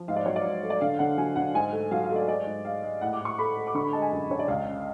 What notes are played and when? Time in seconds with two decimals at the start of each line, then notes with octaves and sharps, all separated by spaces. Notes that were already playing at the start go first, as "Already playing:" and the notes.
Already playing: F3
0.08 G#2 F5
0.16 D5
0.26 F#3 C#5
0.36 D5
0.44 G#2
0.63 A3
0.70 D5
0.81 D3 F5
0.99 D3 F#5
1.18 F#3 G#5
1.36 D3 F#5
1.54 G#2 G#5
1.72 A3
1.91 F#3 F5
2.04 F5
2.10 A3
2.16 D5
2.27 G#3 D5
2.46 G#2
2.65 G#3 F5
2.83 G#3
3.01 A2 F#5
3.13 D6
3.20 A2
3.25 C#6
3.39 A3 B5
3.57 A3
3.67 D6
3.75 D3 C#6
3.85 B5
3.93 G#3 A5
4.02 G#5
4.12 F#2
4.30 D3 C#5
4.39 D5
4.48 C#2 F5
4.67 C#3